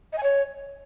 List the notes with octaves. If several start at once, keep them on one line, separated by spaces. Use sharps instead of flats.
D#5
G#5
C#5